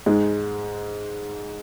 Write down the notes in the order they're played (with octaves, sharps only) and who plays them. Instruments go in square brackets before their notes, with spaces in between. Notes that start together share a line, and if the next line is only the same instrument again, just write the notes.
[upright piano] G#2 G#3